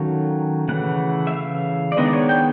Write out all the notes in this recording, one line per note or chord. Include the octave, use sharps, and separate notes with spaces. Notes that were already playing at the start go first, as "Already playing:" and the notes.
Already playing: D#3 F#3 A3 C#4 F5
C#3 E3 A3 F#5
E5
F5
D5
D#3 G#3 B3 D4 D#5
D5
C#5
G5